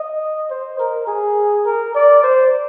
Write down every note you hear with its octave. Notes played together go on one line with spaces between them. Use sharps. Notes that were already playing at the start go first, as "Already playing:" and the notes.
Already playing: D#5
C5
A#4
G#4
A#4
D5
C5